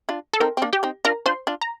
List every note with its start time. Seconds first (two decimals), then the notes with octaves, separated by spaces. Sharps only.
0.09 D4 F4
0.33 A4
0.40 C4 D#4 A#4
0.57 C4
0.62 A#3 D4
0.73 G4 G5
0.83 C4 D#4
1.05 D4 F4 A#4 A#5
1.26 D4 F4 C5 C6
1.47 D4 F4
1.61 A#5